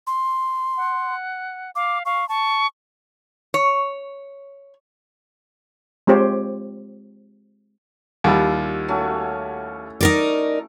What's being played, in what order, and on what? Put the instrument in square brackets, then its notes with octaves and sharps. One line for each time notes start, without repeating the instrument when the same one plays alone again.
[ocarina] C6
[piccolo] F#5
[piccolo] F5 [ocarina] D6
[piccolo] F5 [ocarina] C#6
[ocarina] A5 [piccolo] C#6
[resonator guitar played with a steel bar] C#5
[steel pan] G#3 C4 F4 G4 C5 C#5
[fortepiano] D#2 G3 [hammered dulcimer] E4 F4 F#5
[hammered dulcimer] A3 C#4 F#4
[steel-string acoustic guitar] D#4 A#4 D5